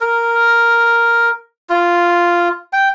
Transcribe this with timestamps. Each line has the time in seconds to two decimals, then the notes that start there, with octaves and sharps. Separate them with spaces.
0.01 A#4
1.69 F4
2.73 G5